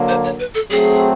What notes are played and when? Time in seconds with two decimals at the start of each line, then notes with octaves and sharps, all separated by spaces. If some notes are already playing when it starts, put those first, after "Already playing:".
Already playing: D3 F#3 A#3
0.09 C5
0.24 C#5
0.39 B4
0.55 A4
0.70 F#3 A3 C4 G#4